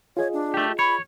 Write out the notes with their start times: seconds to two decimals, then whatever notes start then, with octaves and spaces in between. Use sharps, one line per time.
0.17 F4 G#4 C#5 D#5
0.33 D4
0.54 A3 G4
0.79 C#5 B5